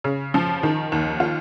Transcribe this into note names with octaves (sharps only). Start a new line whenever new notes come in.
C#3
F3
D#3
D#2
F4